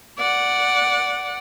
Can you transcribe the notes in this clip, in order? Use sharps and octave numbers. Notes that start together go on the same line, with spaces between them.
D5 F#5